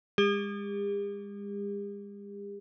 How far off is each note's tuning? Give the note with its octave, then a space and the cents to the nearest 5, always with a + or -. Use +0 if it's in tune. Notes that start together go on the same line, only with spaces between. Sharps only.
G#3 -40 G4 +45